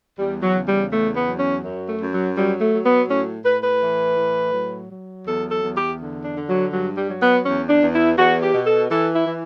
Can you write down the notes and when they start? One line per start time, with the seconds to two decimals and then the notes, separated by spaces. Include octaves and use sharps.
0.18 E2 G3
0.42 F#3
0.55 C#3
0.67 G3
0.91 E2 A3
1.15 B3
1.27 F#3
1.39 C#4
1.63 F#2
1.88 A3
2.00 F#2
2.13 F#3
2.36 F#3 G3
2.61 A3
2.73 F#3
2.85 B3
3.08 A2 C#4
3.45 A2 B4
3.64 B4
3.81 E3
4.18 A2
4.54 F#3
4.90 F#3
5.27 E2 A4
5.51 A4
5.63 E2
5.76 G4
6.00 D3
6.24 D4
6.36 D3
6.48 F#3
6.72 G2 F#3
6.96 G3
7.09 F#3
7.21 B3
7.45 E2 C#4
7.69 D4
7.82 E2
7.94 E4
8.17 E2 F#4
8.42 G4
8.54 B2
8.66 A4
8.90 E3 A4
9.15 E4
9.26 E3